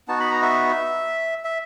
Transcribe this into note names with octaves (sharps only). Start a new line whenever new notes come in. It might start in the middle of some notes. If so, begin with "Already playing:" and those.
B3 D#4 F#4 A5
B5
A#5
E5
E5